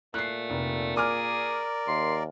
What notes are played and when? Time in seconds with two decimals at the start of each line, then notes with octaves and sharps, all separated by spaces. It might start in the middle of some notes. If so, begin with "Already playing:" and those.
0.14 A#2 A3 F#6 C7
0.50 F1
0.96 G#4 A#4 D5 G#5 D6 F6
1.87 D#2 C6